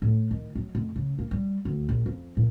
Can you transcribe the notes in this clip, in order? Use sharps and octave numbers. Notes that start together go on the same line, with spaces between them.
A2
D#3
F#3
F1
C#3
A#3
G3
D2
A#1
F2
A#2